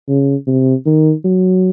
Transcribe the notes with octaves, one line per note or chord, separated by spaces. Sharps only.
C#3
C3
D#3
F#3